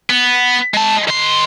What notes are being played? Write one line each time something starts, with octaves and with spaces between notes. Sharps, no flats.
B3
G#3 A5
D#3 C6